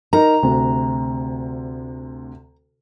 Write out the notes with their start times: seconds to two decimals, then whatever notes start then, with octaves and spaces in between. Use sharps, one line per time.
0.13 D#4 A#4 A#5
0.43 D2 C3